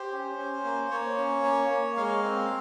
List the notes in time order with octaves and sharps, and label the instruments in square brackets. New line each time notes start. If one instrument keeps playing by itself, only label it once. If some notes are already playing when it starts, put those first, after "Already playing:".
Already playing: [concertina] G4 C5
C#4
C#4
A#3
A#3 C#5
C#4
A#3
A#3
G#3 F5
C4